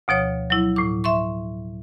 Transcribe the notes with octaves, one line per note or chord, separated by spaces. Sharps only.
D2 B2 F3 C#5
F#3 E4
A2 D6
E5 C6 C#6